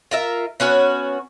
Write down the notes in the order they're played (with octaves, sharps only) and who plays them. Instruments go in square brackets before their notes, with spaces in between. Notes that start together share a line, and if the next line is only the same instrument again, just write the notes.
[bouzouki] F4 A#4 E5
B3 C#4 F#4 C#5